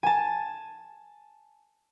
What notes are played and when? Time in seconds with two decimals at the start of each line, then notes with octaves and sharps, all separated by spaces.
0.03 G#5 A5